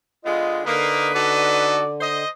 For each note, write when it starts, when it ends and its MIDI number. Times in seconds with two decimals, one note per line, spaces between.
0.25 0.61 50
0.25 0.61 56
0.25 0.61 59
0.25 0.62 65
0.25 0.62 75
0.65 2.24 50
0.65 1.08 58
0.65 1.11 63
0.65 1.73 71
1.14 1.82 63
1.14 1.82 66
1.14 1.82 69
1.14 1.95 74
2.00 2.28 72
2.00 2.28 75